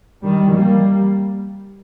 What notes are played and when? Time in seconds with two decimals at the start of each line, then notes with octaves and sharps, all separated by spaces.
0.23 D#3 G3
0.53 G3 A#3